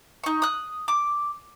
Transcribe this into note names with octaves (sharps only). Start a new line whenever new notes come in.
D#4 C#6
D#6 F#6
D6